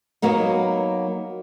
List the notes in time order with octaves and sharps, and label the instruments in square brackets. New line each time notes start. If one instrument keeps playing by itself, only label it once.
[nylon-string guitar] F#3 A#3 B3 D#4